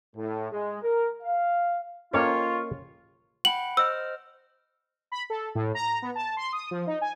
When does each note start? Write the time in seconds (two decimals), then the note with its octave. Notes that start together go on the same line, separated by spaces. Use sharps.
0.15 A2
0.52 G#3
0.82 A#4
1.23 F5
2.13 A#3 C#4 F4 A4 C5 C#5 D#5 G5
3.45 F#5 G5 B5 F#7
3.77 C5 D#5 E6 F6
5.12 B5
5.30 A4
5.55 A2
5.75 A#5
6.02 B3
6.15 A5
6.37 C6
6.52 D#6
6.71 F3
6.87 D#4
7.01 G#5